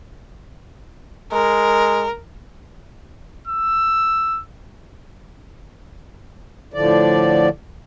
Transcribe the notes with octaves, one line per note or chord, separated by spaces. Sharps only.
G#3 A#4
E6
A2 D3 F3 D5